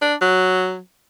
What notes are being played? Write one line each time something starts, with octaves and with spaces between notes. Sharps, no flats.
D4
F#3